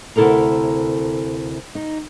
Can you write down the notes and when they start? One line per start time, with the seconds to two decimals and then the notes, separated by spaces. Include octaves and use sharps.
0.16 D2 C3 E4 A4 A#4 A#5
1.75 D#4